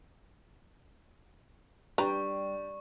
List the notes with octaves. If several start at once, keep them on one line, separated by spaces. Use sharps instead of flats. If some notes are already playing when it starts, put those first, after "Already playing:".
G3 D4 G4 B4 A#5 C#6